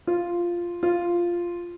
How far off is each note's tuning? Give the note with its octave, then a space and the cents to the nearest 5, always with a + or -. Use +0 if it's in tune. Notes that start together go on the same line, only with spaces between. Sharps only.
F4 -5
F4 -5